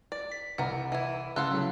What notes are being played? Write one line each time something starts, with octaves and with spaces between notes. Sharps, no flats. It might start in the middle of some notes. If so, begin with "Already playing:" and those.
D5
B6
C2 E3 A#4 F#5
E3 E4
C#2 A4 F5 F#5 C6 E6 F#6
A2 C#3 F#3